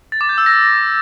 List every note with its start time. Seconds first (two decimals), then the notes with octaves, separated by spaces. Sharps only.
0.12 A6
0.21 D6
0.29 G6
0.38 E6
0.46 A#6